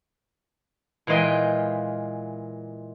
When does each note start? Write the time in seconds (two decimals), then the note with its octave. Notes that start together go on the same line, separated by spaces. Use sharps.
1.07 A#2 E3 G#3 F4 D#5 G5